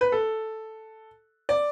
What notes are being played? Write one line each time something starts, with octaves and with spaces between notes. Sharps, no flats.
B4
A4
D5